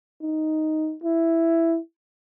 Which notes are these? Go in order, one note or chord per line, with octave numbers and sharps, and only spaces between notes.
D#4
E4